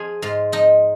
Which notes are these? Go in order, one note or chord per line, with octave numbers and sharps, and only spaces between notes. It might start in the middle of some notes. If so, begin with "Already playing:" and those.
Already playing: F3 G#4
G#2 F4
F3 D#4